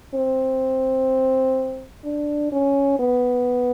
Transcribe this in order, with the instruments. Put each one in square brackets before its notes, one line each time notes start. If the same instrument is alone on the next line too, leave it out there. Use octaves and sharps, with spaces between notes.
[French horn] C4
D4
C#4
B3